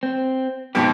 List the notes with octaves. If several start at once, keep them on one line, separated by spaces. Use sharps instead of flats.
C4
F2 G#2 B2 G4